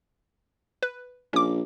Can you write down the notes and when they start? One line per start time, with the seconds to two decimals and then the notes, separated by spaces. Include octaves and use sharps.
0.83 B4
1.33 A#1 C#4 D6